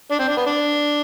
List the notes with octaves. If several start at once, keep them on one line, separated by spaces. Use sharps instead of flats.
D4
C4
D4
B3
D4